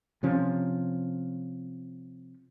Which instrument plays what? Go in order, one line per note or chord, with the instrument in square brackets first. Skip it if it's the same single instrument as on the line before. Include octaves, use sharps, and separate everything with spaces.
[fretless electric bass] C3 F3 C#4